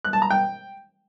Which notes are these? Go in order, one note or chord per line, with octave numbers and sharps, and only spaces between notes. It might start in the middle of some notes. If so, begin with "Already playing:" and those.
F#6
A5
A#5
G5